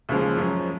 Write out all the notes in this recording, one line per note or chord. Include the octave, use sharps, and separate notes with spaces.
D#2 C#3 F3 G#3
F#2 F3 G#3 C#4